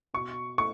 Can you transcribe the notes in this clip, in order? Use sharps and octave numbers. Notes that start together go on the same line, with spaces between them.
B2 C#6
A3 C#6